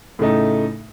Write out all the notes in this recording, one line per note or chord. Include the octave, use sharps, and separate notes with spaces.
A2 C#3 A3 D#4